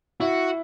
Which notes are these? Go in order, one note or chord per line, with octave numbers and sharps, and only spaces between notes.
E4 F#4